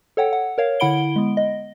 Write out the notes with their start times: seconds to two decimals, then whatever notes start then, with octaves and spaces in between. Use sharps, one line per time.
0.17 A4 C#5 F#5 G5
0.33 F#5
0.58 A#4 C#5 F5
0.80 D3 E4 F#5 B5 D7 G7
1.16 G#3 B3
1.37 D#5